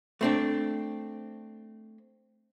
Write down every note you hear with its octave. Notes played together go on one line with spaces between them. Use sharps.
A3 C4 D4